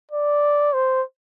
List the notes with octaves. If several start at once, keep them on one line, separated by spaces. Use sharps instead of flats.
D5
C5